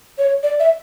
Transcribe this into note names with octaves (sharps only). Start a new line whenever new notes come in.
C#5
D5
E5